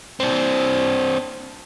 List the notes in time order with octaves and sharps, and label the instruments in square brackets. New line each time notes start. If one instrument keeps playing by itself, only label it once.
[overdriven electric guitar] C4 D4